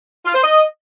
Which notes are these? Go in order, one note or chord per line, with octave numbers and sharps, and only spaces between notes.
F4
C5
D#5